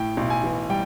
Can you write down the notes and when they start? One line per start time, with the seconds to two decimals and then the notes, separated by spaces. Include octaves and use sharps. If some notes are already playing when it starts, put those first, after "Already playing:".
Already playing: A2 G5
0.17 B1
0.30 G#5
0.44 E3
0.70 G3 G5